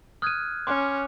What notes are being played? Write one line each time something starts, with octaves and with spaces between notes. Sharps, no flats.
D#6 F6 F#6 G#6 D#7
C#4 C6 D6 F#6